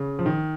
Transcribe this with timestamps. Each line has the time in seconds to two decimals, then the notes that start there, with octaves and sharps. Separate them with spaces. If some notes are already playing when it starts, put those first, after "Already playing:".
Already playing: C#3
0.19 F3
0.26 D#3